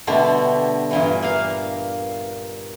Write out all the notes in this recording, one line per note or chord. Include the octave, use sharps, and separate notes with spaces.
B2 D3 G3 A3
G2 A#2 E3
A#3 F5